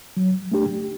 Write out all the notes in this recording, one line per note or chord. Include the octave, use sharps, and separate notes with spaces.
F#3
A3 D4 G4